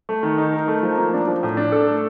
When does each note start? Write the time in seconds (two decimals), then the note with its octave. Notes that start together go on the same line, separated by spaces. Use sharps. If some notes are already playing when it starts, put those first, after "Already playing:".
0.09 A3
0.23 D#3
0.38 D#4
0.53 A#4
0.68 A3
0.83 F3
0.97 A#3
1.14 D4
1.27 F3
1.43 A2
1.57 D4
1.72 A4
1.87 A3